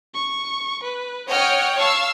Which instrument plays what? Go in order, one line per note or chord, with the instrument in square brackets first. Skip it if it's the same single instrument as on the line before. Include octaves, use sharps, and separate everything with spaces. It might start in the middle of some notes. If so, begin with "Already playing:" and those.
[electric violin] C#6
B4
[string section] C#5 F#5 G5 [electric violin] D#5 F6
[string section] F5 E6 [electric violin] A5 C#6